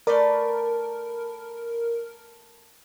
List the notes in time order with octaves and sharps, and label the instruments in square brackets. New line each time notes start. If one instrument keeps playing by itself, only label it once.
[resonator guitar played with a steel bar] A3 B4 D5 [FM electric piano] A#4